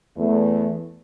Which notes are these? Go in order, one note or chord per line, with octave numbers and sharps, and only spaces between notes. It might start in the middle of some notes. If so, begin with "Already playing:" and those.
E2 A3